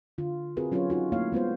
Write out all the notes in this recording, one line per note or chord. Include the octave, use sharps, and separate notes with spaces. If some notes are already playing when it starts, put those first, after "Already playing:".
D3 F4
C4 F4 F#4 G#4 A#4 B4
F#3 C#4 F4 G4 B4 C#5
D#4 F4 F#4
A3 A#3 E4 C#5 F5
G#3 B3 F4 C5